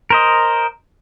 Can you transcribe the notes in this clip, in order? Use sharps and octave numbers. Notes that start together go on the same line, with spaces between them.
A#4 C5 D#5